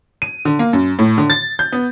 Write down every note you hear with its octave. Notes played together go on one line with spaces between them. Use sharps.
D#7
D3
A#3
F#2
A2
D3
A6
G6
B3